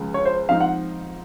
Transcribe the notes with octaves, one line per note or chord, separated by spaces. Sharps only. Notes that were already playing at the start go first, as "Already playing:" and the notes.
Already playing: C#2 C#3 F3 G#3
C#5
C5
G#2 F3 C4 D#4 F5
F#5